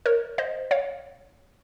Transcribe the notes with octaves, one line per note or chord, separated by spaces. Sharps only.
A#4 C#5
C5 D#5
C#5 F5